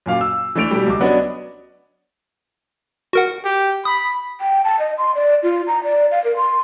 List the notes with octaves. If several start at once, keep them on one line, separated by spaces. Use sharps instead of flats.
F#2 A#2 F5 D6
E6
E3 A3 D4 D5 D7 F7
B2 G3
C#2 D6
F#3 B3 C#4 D4 D5 D#5
F#4 A#4 F#5
G4
B5 D#6
G5
A5
D#5
C6
D5
F4
A#5
D5
F5
A#4
C6